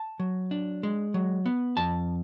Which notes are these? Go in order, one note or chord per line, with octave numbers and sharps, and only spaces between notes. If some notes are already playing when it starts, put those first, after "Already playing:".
Already playing: A5
F#3
D4
G#3
F#3
B3
F2 A5